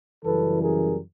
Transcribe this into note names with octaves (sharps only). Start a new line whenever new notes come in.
F#2 C#3 E3 G3 A4 B4
G#4 A#4